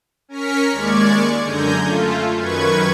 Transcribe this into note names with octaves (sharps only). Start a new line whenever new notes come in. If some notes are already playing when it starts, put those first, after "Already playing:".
C#4 A#4 F6 B6 C#7
D#2 G#3 D5 C#6 G#6
F#2 D3 G#5 A#5 G6
A3 F4
F#2 D#3 B4 C#6 G#6